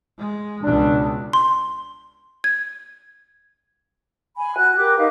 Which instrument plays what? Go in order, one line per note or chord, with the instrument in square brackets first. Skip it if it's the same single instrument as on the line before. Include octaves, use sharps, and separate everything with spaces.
[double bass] G#3
[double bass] C#2 B2 [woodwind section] D4
[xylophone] C6
G#6
[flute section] G#5 B5
F#4 F#6
G4 A#4 D6 F#6
D#4 A#4 B4 F5